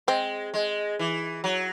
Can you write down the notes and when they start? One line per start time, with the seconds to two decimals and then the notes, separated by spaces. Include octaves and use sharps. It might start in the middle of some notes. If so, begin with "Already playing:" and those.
0.08 G#3 C4
0.54 G#3
0.99 E3
1.44 F#3